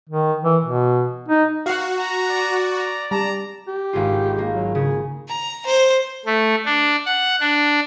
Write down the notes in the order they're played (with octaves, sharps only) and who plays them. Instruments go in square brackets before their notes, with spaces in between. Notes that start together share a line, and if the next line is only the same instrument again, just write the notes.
[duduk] D#3
E3
B2
D#4
[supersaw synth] F#4 [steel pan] F5 F#5
[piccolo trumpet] A#5
[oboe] D5
[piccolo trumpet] A#5
[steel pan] G3 A5 [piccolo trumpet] A#5
[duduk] G4
[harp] G#1 G#2 F4
A#3
[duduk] F#3
[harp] C#3 [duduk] G#4
[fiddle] A#5
C5
[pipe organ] A3
D4
F#5
D4